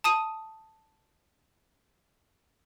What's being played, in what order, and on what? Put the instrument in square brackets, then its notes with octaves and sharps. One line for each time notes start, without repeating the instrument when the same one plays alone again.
[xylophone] A5 D#6 D#7